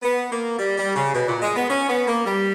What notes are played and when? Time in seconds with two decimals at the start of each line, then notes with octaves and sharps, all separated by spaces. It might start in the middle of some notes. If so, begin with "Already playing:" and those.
0.03 B3
0.31 A#3
0.59 G3
0.78 G3
0.96 C#3
1.15 B2
1.28 A#2
1.42 G#3
1.56 B3
1.70 C#4
1.89 B3
2.08 A#3
2.26 G3